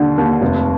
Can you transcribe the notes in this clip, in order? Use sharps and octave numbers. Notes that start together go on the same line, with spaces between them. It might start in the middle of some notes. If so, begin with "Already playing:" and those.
Already playing: D#2 D3
D#2
F1